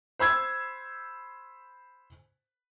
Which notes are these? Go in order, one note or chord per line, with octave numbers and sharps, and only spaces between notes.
C5 B5 E6 G#6